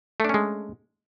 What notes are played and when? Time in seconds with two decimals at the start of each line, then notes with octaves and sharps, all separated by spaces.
0.20 A3
0.24 D4
0.29 C#4
0.34 G#3